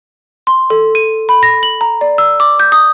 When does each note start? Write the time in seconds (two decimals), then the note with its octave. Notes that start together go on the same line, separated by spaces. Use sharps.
0.47 C6
0.70 A4
0.95 D#7
1.29 B5
1.43 A#6
1.63 F#7
1.81 A#5
2.01 D5
2.18 E6
2.40 D6
2.60 G6
2.72 D#6